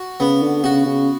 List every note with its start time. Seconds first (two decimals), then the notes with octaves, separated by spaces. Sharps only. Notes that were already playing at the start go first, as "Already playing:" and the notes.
Already playing: F#4
0.20 C#3 B3
0.43 D3
0.64 C#3 F#4
0.86 C#3